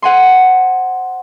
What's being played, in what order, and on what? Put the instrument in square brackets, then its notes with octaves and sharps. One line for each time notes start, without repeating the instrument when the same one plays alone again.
[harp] C5 F#5 G#5 C6